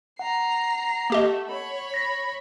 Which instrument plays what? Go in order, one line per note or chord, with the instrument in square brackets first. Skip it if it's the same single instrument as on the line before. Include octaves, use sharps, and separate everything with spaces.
[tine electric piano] F#5 [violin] A#5 C7
[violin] A3 [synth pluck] A#3 G4 D#5
[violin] C#5 B5
[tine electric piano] A#6 B6